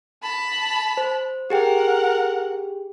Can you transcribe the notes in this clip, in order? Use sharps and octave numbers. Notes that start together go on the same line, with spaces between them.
A5 B5
C5
G4 G#4 A#4 F#5 G5